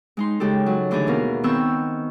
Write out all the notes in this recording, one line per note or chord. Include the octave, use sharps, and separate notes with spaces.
G#3 D#4 C6
C#3 G#3 G4 A4
F#3
D3 E3 A3 D4 D#4 G#4
D#2 B2 A#4
D#3 B3 C4 C#6 E6 G6